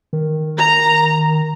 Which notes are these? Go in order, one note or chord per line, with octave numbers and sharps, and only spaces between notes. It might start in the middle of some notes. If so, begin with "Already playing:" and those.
D#3
A#5